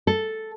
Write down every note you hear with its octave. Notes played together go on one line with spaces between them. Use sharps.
A4